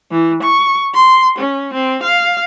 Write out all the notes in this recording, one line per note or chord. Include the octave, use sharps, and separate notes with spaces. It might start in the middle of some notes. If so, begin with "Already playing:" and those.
E3
C#6
C6
C#4
C4
F5